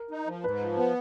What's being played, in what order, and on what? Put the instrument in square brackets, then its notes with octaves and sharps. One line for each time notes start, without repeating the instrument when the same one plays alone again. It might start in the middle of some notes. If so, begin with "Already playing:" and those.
Already playing: [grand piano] A#4
[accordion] D#4
F3
[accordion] G#2 [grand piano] B4
[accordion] F3
B3